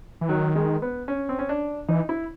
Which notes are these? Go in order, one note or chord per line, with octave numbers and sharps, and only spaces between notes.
E3
D#3 F#3
G#3
B3
C#4
C4
C#4
D4
E3 D#4
E4